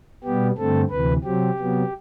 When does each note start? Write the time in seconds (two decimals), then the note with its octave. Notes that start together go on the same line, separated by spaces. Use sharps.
0.24 B2 G3 B3 G4
0.58 G2 D3 A3 C4 A4
0.90 D2 C3 E3 B4
1.24 C3 F#3 C4 G4
1.58 C3 F#3 B3